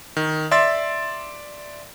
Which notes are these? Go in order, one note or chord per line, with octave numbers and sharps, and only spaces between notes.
D#3
D5 E5 C6 E6 A6